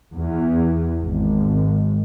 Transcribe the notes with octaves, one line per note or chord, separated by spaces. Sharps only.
E2
G#1